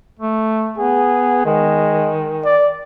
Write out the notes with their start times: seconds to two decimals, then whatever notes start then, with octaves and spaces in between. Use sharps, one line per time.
0.19 A3
0.78 B3 G#4
1.45 D#3 G#3
2.45 D5